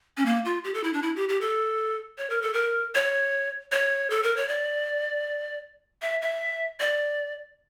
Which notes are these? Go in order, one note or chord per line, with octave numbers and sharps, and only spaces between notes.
C#4
A#3
F4
G4
A4
E4
D4
E4
G4
G4
A4
C#5
A#4
A4
A#4
C#5
C#5
A4
A#4
C#5
D5
E5
E5
D5